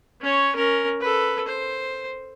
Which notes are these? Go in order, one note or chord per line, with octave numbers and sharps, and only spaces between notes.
C#4 C#5
C#4 A#4
A4 B4
C5